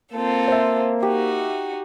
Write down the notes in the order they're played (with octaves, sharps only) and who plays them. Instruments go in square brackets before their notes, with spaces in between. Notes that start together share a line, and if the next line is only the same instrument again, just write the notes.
[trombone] A#3 [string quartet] C4 F4 A4
[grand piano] C5 E5
[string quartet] D#4 F#4 [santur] G4